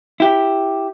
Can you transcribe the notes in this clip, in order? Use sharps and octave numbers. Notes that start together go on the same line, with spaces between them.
E4 G4